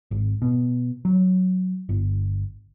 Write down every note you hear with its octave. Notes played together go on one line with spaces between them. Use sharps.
G#1
B2
F#3
G1